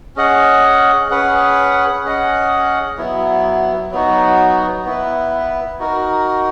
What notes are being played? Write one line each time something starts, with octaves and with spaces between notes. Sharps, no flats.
C#4 G#4 D#5 F#5
C#4 G#4 B4 F#5
C#4 G#4 D#5 F#5
F#3 B3 E4
F#3 B3 D#4 F#4
B3 E4 B4
D#4 F#4 A#4